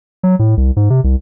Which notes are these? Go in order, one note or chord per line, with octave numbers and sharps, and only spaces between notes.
F#3
A2
C2
G#2
C3
C2